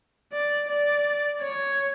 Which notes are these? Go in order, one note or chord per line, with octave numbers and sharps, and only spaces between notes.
D5
D5
C#5